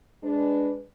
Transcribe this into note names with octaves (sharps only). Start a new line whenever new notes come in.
G#3 D4 B4